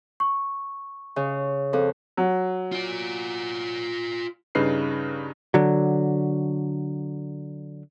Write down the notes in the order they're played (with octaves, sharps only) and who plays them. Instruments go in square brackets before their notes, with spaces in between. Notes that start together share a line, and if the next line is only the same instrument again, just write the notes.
[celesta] C#6
[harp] C#3
[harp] F2 [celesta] A4
[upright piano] F#3
[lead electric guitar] F4 D5
[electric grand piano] G2 C#3 D#4 B4 C7
[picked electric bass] D3 F#3